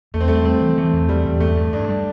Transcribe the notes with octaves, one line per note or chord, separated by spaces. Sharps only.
E2 A3
C4
G3 A3
G3 C4
E3
E3 A3
E2
E3 G3
E2
G2 A3
G2
G2 D4
G3